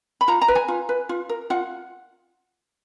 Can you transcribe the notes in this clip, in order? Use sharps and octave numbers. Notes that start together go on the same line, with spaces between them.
B5
F4 A#5
A#5
B4
G#5
F4
B4
F4
A#4
F4 F#5